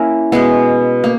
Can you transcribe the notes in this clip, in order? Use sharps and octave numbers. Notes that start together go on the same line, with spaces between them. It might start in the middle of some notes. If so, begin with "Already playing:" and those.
Already playing: A#3 C#4 E4 A#4
B2 G#3 B3
A#3